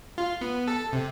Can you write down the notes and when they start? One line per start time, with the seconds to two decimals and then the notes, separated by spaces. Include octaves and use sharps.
0.18 F4
0.41 B3
0.68 A4
0.93 C3